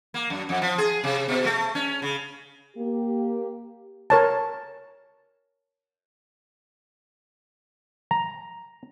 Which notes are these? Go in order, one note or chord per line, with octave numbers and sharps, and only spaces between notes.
A#3
F#2
F2
F3
G#4
C3
B2
A3
C#4
C#3
A#3 G4
A#4 C#5 A5
A#5